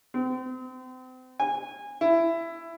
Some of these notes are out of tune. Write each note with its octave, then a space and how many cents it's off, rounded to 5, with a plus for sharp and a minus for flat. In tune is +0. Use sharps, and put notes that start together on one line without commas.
C4 -35
G#5 -20
E4 +15